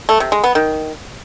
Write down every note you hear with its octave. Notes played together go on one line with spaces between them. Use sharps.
A3
C3
G#3
B3
D#3